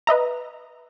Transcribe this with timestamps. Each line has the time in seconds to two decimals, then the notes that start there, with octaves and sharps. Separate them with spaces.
0.07 B4 D#5 E5 A#5